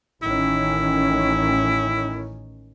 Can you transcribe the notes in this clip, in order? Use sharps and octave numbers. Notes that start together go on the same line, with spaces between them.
A1 D#3 C#4 E4